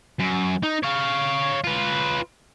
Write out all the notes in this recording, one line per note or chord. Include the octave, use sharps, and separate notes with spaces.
F#2
D#4
C#5 F5
F4 B4